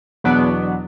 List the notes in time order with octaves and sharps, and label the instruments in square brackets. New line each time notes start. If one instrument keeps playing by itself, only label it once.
[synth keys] E2 B2 F#3 B3 D4